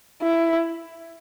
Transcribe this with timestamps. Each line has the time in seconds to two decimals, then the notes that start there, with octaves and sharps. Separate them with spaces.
0.22 E4